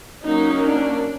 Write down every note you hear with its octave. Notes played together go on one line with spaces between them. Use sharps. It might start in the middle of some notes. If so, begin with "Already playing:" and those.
F#3 A#3 C#4 D#4
D4